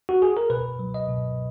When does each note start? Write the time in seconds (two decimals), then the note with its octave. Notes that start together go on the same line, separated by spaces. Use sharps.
0.09 F#4
0.22 G#4
0.37 A#4
0.50 B2 B4
0.79 F#3
0.94 D#5
1.09 B2